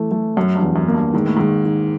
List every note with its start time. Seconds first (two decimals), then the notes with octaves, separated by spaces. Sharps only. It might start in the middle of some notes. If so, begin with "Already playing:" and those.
Already playing: E3 A3
0.11 A3
0.37 F#2 F#3
0.55 G2
0.62 E2
0.76 F#2
0.88 A#3
0.94 G2
1.14 G#2 D#3
1.26 A2
1.36 G#2 D#3
1.65 D#3